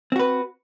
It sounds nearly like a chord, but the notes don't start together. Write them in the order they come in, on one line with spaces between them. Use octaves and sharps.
C4 F#4 B4